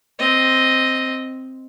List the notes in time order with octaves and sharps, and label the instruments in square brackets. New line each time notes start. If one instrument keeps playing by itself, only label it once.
[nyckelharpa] C4 D#5